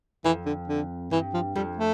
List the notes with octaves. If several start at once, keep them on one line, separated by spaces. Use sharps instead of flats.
F2 E3
D3
D3
G2 E3
F3
F2 G3
A3